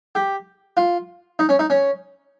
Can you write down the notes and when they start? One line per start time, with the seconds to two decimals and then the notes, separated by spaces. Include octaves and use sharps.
0.15 G4
0.77 F4
1.39 D#4
1.49 C#4
1.59 D#4
1.70 C#4